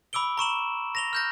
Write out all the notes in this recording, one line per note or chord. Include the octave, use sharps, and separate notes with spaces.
B5 D6 E6 D7 G7
A#5 C#6 E7 F#7
A#6 F7 G7
F6 G6 A#6